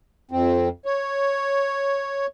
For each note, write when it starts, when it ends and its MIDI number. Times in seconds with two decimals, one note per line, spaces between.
0.31 0.69 41
0.31 0.69 60
0.85 2.26 73